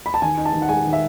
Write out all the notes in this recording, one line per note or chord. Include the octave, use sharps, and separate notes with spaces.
B5
A5
D#3 G#5
D#4
A5
D#3
F#5
G#3 G#5
D#3
E5